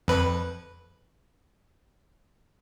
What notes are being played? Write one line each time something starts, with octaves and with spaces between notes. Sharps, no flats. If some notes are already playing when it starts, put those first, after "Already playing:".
F2 B4